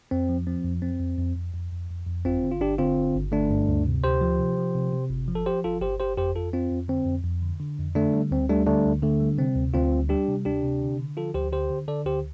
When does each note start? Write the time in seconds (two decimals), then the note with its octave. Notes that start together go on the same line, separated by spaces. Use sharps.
0.11 F2 C4
0.29 F3
0.47 F3 C4
0.65 F2
0.82 F2 C4
1.00 F2
1.18 F2
1.36 F2
1.54 F2
1.72 F2
1.90 F2
2.07 F2
2.25 G1 C4 F4
2.43 D3
2.51 F4
2.61 G1 D4 G4
2.78 D3 C4 F4
2.97 G1
3.14 G1
3.32 D3 A3 D4
3.50 G2
3.69 D2
3.86 C3
4.04 D2 G4 C5
4.21 F3
4.39 C3
4.58 F3
4.75 C3
4.93 C3
5.10 G1
5.28 F3
5.35 A4
5.46 F3 G4 C5
5.64 G1 F4 A4
5.81 G1 G4 C5
5.99 G1 G4 C5
6.17 F2 G4 C5
6.35 F2 F4 A4
6.53 F2 C4 F4
6.71 F2
6.88 D3 C4
7.06 F2
7.24 F2
7.42 D3
7.60 D3
7.78 F2
7.95 D3 A3 D4
8.13 G3
8.31 D2 C4
8.49 G3 A3 D4
8.67 D3 A3 D4
8.85 D2
9.03 D3 A3
9.20 G3
9.38 C3 C4
9.56 D2
9.74 D2 C4 F4
9.92 G3
10.09 G3 D4 G4
10.28 C3
10.45 D2 D4 G4
10.64 C3
10.81 D3
10.99 D3
11.17 F3 F4 A4
11.34 D2 G4 C5
11.52 D3 G4 C5
11.70 D3
11.88 D3 A4 D5
12.06 D2 G4 C5